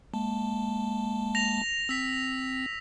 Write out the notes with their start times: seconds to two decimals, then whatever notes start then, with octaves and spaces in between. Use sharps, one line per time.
0.14 G#3 A#3 A5
1.35 A#6 F7
1.89 C4 E6 B6